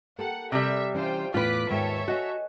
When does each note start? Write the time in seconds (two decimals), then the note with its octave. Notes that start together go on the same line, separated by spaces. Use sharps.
0.18 A#3 G4 A4 F#5
0.52 C3 G3 E5
0.94 E3 C#4 F4 C5 D5 G5
1.34 E2 A2 F4 B4 D6 F#6 B6
1.69 D#2 G#2 A4 C#5 E5 G5
2.08 F#4 D#5 G#5